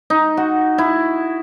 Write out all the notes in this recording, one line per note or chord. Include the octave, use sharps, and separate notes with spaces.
D#4
F#4
E4